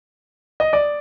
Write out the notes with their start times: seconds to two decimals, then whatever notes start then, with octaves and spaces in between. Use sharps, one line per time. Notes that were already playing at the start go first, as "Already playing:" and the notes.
0.60 D#5
0.73 D5